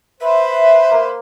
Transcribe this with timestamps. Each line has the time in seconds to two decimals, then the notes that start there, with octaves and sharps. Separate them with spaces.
0.21 B4 C5 E5
0.91 A#3